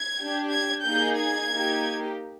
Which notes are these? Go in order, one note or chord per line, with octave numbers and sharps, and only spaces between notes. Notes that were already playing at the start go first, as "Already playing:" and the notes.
Already playing: G#6
D4 G4
G#6
A#3 D#4 G#4 G6
G#6
A#3 D#4 G4